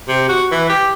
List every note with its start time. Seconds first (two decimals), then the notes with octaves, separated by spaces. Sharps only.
0.08 C3
0.29 F#4
0.52 E3
0.69 G4